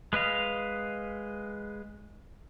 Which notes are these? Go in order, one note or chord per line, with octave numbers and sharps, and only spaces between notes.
G#3 B4 D#5 F5